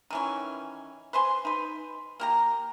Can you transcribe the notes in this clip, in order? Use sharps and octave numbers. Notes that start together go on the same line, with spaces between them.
D#3 E3 C#4
B4 C5 G#5 C6
D#4 B4
A#3 G4 A#5